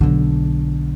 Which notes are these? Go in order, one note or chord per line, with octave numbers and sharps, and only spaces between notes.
B1 D3